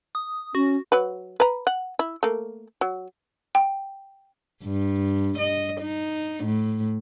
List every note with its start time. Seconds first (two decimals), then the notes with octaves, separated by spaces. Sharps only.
0.15 D#6
0.55 C#4 F#4
0.92 F#3 B4
1.40 B4 A#5
1.67 F#5
1.99 E4
2.23 A3 A#3
2.81 F#3
3.55 G5
4.63 G2
5.38 D#5
5.81 D#4
6.44 A2